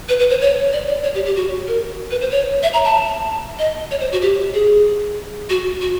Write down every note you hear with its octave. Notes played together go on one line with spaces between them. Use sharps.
B4
B4
C5
C#5
D5
D5
C#5
G4
G4
F#4
A#4
B4
C5
C#5
E5
A#5
A5
D#5
C#5
C5
F#4
G4
G#4
F#4
F#4